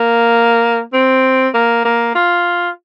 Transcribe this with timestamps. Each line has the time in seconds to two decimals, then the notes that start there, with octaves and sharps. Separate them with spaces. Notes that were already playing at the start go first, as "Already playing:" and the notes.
Already playing: A#3
0.93 C4
1.54 A#3
1.85 A#3
2.15 F4